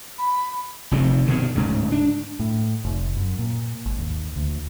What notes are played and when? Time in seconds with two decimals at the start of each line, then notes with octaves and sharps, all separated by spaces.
0.18 B5
0.91 F1 F2 C3 D#3
1.26 G2 B2 D3 D#3
1.56 D1 G#2 C#3
1.92 D4
2.39 A2
2.84 F1
3.16 F#2
3.39 A#2
3.86 G#1
3.99 D#2
4.36 D2